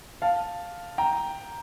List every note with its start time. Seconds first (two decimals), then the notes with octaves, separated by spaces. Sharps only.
0.22 F5 A5
0.98 G5 A#5